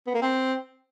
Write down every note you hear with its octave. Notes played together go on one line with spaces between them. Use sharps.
B3
A#3
C4